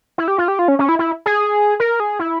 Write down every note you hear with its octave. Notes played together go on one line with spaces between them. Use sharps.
E4
G4
F4
G4
F4
C#4
C#4
E4
E4
G#4
A#4
G#4
E4